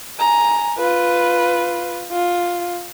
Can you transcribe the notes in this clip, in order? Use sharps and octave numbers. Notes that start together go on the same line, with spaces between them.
G#5 A#5
F4 B4
F4